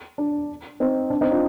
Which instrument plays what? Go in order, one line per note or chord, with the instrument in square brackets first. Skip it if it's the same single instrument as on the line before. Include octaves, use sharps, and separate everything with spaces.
[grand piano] D4
C4 D#4
D4
C4 D#4
D4 F4